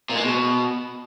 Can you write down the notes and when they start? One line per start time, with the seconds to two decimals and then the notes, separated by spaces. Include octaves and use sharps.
0.10 A#2
0.16 G#3
0.22 B2